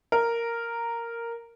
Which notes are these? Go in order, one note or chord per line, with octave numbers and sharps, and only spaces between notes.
A#4